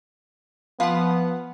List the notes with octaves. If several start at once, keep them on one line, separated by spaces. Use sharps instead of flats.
F3 B3 B4 F5 F#5